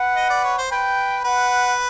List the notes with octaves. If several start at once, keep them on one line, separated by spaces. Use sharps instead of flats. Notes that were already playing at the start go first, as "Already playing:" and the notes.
Already playing: B4 F#5
D#5
D5
C#5
C5
B4 G5
B4 F#5